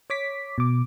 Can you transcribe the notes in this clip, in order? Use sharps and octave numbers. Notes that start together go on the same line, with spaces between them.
C#5 D6 B6
B2 D6